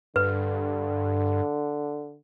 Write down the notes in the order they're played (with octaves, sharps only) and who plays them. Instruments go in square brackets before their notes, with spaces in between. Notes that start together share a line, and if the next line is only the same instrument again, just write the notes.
[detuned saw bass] G2 [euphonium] D3 [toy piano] B4